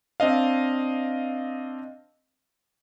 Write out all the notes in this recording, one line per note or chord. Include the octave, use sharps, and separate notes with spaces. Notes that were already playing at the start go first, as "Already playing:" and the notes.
C4 D4 D#5 F5